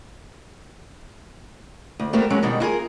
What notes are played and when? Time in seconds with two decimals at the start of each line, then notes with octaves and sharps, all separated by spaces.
2.00 D2
2.13 G3 A3 B3 G4 A#4 C5
2.30 F#3 G#3 C#4
2.43 G#2 B2 D#3 G3
2.60 E4 F4 G#4 A#4